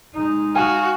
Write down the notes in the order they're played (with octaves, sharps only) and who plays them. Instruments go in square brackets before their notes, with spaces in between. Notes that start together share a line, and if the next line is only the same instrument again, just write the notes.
[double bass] G#3 D#4
[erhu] F#4 [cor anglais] F5 [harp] G#5